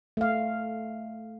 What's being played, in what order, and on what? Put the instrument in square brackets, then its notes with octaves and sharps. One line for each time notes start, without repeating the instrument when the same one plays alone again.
[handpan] A3 F5